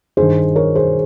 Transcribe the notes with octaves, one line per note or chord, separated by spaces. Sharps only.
G2 D#3 G#4 C5
A#4 C#5
G#4 C5